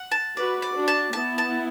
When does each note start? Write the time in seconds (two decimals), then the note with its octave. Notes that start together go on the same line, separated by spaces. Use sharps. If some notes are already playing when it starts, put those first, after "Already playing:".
Already playing: F#5
0.12 A5
0.37 F#4 B4 D5
0.62 D5
0.75 D4 F#4
0.88 A5
1.13 B3 E4 A5
1.38 A5